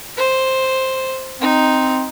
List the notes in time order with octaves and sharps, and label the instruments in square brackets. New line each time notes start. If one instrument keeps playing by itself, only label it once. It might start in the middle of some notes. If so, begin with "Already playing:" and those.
[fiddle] C5
[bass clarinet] C4 [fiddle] D#4